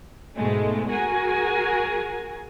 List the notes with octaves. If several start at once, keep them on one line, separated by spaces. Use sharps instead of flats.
G#2 B2 G#3 A3
F#4 G#4 A#4 G#5